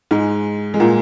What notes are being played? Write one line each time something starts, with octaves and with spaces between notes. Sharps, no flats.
G#2 G#3
G#3
A#2 A#3